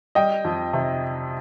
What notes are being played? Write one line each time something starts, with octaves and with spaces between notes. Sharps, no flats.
G3 D#5 G5
F2
C3